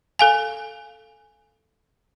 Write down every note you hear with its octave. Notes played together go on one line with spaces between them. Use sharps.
A4 F5 G#5